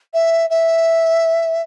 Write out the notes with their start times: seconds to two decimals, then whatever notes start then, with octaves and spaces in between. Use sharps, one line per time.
0.14 E5
0.50 E5